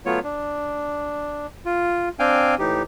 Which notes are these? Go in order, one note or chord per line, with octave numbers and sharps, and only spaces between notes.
F#3 A3 B3 F4 C#5
D4
F4
C4 D4 F5 G5 G#5
A2 E3 D#4 G4